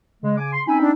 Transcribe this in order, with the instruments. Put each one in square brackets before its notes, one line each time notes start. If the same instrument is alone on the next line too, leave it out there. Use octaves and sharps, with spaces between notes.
[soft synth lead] C#3 [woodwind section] G#3
[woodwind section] G#5 D6
C6
[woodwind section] C4 C#4 B5 [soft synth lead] D#4 [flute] G#5
[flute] D4